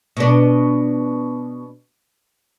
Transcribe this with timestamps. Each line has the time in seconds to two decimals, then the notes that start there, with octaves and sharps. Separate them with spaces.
0.17 B2 D4